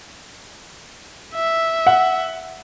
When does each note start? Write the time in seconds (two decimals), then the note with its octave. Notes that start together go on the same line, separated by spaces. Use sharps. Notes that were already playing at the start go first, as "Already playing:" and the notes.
1.35 E5
1.86 F#5